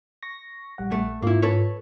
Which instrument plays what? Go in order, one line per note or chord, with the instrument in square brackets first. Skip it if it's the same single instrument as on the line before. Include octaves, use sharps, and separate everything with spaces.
[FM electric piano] C#6 A#6
A#1 G3 F#5
[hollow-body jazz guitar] A3
[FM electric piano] G#2 F4 [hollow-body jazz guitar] A#3 E4
[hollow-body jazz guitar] A4 B4 C#5